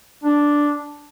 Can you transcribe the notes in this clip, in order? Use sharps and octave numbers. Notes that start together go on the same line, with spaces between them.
D4